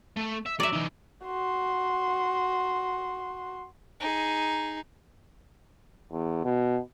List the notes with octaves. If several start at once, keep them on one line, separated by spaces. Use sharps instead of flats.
A3
E5
F#3 D5 E5
E3 D#4
F#4 C6
D#4 G#4
E2
B2